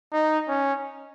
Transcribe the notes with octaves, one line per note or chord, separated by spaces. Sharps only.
D#4
C#4